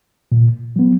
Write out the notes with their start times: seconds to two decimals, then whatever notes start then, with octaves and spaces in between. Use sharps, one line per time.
0.32 A#2
0.76 F#3 B3